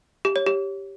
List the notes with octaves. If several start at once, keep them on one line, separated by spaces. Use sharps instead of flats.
G4
C#5
G4